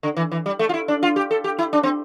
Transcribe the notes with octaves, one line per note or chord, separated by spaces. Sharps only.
D3
E3
E3
G3
A3
F4
E4
D4
F4
G4
A4
G4
E4
D4
C4